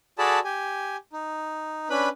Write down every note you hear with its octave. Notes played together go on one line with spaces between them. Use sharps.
F#4 G#4 A4 D5 A5 B5
G4 G#5
D#4
C#4 D4 B4 B5